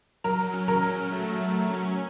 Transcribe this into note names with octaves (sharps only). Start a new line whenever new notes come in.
F#3 A#4
C#4
A#4
F#3
A3
F#3
C#4